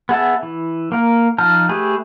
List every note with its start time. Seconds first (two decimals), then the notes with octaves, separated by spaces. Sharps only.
0.09 B3 G#4 E5 A5
0.43 E3
0.92 A#3 A#4
1.38 F3 D#4 A5 F6
1.69 A3 G4 G#4 B4